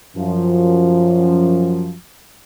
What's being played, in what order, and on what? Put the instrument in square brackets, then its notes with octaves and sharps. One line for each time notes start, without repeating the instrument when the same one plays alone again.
[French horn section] F#2 F3